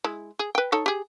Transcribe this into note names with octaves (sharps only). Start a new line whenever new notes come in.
G#3 E4
G#4
B4 G5
D#4 A4 C#5
G4 G#4